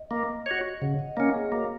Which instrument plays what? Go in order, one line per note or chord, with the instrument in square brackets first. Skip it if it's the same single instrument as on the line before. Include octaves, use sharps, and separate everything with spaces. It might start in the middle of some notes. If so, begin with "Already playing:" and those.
Already playing: [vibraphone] D#5
[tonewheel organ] A#3
F#4 C#5
[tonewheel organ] C#3 [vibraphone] F#5
[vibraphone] D#5
[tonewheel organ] A#3 C#4 [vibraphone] C#5
[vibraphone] G#4
[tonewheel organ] A#3 [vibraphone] F#4